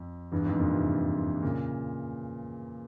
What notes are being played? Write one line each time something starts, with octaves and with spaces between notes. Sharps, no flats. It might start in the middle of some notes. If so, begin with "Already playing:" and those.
Already playing: F2
E2 G2
F2 G#2
G2 A#2
G#2 C3
A#2 C#3